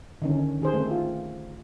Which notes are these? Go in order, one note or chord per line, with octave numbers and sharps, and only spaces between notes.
D3 D#3 C#4
D#3 G#4 C5
A3 C4
F4